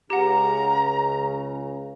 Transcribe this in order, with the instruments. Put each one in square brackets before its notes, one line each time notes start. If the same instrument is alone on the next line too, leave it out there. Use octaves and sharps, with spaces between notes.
[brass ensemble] C#2 C#3 [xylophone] G4 F#5 [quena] A#5